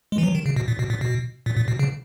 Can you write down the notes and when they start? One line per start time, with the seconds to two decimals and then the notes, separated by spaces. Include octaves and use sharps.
0.12 G#3
0.18 E3
0.24 F#3
0.35 D#3
0.46 C#3
0.56 B2
0.68 A#2
0.79 B2
0.90 A#2
1.01 B2
1.46 A#2
1.57 A#2
1.68 B2
1.79 C#3